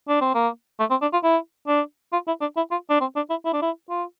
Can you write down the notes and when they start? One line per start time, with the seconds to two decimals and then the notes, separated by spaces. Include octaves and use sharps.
0.09 D4
0.21 C4
0.35 A#3
0.80 A3
0.90 C4
1.02 D4
1.13 F4
1.23 E4
1.68 D4
2.13 F4
2.27 E4
2.41 D4
2.57 E4
2.71 F4
2.90 D4
3.00 C4
3.16 D4
3.30 E4
3.45 E4
3.53 D4
3.62 E4
3.90 F4